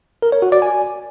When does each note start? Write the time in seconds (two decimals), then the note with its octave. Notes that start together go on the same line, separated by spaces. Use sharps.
0.22 A#4
0.32 C#5
0.42 F#4
0.52 D5
0.62 G#5